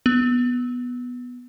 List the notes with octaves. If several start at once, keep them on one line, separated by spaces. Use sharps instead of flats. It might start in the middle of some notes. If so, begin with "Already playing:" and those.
B3